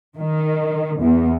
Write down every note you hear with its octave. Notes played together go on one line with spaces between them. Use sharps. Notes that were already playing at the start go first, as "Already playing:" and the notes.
D#3
E2